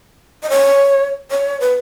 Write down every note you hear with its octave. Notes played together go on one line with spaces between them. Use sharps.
D#5
C#5
C#5
B4